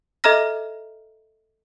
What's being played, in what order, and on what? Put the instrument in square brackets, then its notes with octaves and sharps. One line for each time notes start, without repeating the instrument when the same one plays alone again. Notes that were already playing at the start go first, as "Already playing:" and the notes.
[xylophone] A4 D#5 E5 A#5 F6 A#6